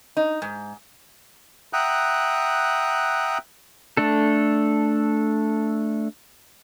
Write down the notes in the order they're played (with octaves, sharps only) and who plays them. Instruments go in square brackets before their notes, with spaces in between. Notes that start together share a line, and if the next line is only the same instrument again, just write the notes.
[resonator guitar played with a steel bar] D#4
G#2
[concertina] E5 F#5 G5 A#5 D#6 F#6
[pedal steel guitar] A3 D4 A4